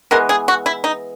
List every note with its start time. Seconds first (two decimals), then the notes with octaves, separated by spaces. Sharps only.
0.11 E3 G#3 B3 A#4
0.29 G#4
0.48 F#4
0.66 E4
0.84 D#4